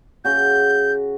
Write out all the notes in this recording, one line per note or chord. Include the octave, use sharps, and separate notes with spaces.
C#3 F#4 G6